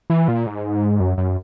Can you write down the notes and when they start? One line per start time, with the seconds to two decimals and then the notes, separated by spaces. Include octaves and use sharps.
0.10 E3
0.28 A#2
0.47 G#2
1.00 F#2
1.18 F#2